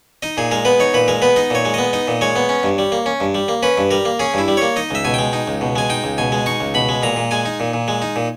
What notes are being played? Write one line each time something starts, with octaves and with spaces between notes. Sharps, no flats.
D#4 D#5
A#2 G#4
G#3 A#4
B3 B4
D#4 C#5
A#2 B4
G#3 A#4
B3 B4
D#4 D#5
A#2 C#5
G#3
B3 D#5
D#4 D#5
A#2
G#3 C#5
B3
C#4
G2
G3
A#3
C#4
G2
G3
A#3
C#4 B4
G2
G3 A#4
A#3
C#4 G#4
G2 E4
G3
A#3 C#5
D#4 D#5
C#2 E5
B2 G#5
G#3 G5
D#4
C#2
B2
G#3 G#5
D#4 G5
C#2
B2 G#5
G#3
D#4 C#6
C#2
B2 B5
G#3
A#2 A#5
A#2
G#3 G#5
D#4
A#2
A#2
G#3
D#4
A#2